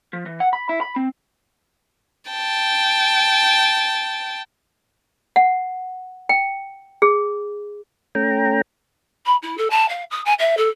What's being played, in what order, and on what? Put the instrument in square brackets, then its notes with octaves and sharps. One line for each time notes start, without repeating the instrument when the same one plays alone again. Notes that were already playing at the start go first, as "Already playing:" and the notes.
[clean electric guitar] F3
E3
F#5
B5
E4
B5
C4
[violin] G5 A5
[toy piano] F#5
G5
G#4
[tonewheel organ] A3 C#4 G5 A#5
[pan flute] B5
E4
A4
A5
F5
D#6
G#5
E5
A4